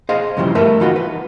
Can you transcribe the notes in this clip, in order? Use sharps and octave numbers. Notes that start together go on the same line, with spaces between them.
G#4 C5 D#5 F5
G2 C#3 E3 F3 G3
A3 A#4 B4 E5
E3 D#4 F4 F#4
B4